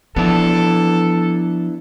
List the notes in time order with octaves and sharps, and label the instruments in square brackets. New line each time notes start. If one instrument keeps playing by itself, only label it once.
[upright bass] F3 [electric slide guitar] B3 D4 E4 [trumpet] A4